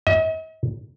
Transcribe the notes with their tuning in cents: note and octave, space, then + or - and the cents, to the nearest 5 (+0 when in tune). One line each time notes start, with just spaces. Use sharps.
D#5 +45